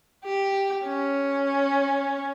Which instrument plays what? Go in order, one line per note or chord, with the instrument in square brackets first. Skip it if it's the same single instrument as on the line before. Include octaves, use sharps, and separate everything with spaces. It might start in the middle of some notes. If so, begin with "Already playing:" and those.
[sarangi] G4
C#4